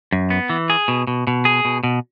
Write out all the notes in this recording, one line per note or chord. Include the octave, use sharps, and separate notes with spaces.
F#2
B3
E3
G#4
B2
B2
B2
G#4
B2
B2